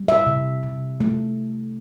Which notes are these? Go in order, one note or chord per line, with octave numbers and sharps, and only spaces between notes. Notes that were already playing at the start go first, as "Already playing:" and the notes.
Already playing: G3
E5
C3
C3
A3